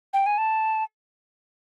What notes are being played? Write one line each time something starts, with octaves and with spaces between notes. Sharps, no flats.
G5
G#5
A5